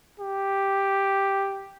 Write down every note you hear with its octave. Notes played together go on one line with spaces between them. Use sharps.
G4